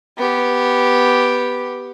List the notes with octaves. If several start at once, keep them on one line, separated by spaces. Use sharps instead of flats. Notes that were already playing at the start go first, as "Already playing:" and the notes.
B3 G4